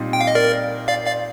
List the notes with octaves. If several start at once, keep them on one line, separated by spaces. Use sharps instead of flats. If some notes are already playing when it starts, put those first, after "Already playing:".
Already playing: A#2 G3 C4 D#4
G5
F5
D#5
A#4 D5
D5 F5
D5 F5